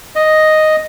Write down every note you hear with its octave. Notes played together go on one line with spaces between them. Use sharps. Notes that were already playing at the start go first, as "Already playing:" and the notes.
D#5